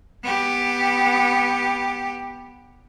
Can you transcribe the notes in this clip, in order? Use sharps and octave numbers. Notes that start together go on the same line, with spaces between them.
B3 G4